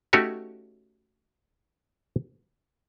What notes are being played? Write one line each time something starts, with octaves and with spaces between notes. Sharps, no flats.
A3 C#4 D#4 F#4 G4 C#5